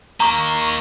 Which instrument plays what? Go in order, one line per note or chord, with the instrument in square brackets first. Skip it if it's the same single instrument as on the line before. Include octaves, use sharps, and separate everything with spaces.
[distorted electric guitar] A#3 D#5 [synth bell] A#5 C#6